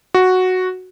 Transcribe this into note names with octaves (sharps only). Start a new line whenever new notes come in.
F#4